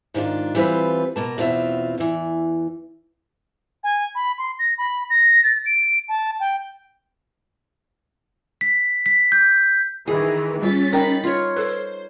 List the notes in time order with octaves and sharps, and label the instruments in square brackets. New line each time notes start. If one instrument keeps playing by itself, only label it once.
[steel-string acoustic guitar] G#2 D#3 D4 F4
E3 G3 C4 F4 B4
B2 A#3 A5
E2 B2 C4 F4 E5
E2 E3
[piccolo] G#5
B5
C6
A#6
B5
A#6
A6
D7
A5
G5
[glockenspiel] B6
B6
G6
[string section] D#3 E3 [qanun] G#4
[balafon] G3 F4 [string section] C#4 A6 B6
[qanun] D#4 B5 [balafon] A#4 G5
[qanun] F4 C#5
[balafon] A4 B4 [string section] C5